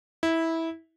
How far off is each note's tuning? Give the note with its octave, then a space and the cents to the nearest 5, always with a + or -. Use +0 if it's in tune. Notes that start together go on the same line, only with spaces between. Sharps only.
E4 -15